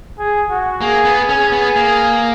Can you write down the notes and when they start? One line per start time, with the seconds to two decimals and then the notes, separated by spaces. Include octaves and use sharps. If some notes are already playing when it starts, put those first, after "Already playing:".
0.19 G#4
0.49 F#4
0.81 A#3 G#4
1.05 B3
1.29 C#4 G#4
1.52 B3
1.76 A#3